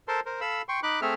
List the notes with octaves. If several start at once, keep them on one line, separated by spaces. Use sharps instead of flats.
A4 A#4 C5 A5 C6
A#4 C5
A4 F5 B5 E6
G5 C6 C#6
D#4 B5 D6 F#6
A3 C4 G#4 A4 E5 F6